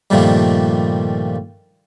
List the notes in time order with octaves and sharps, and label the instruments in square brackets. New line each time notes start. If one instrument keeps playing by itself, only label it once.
[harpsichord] G2 A#2 D#3 F3 G3 A3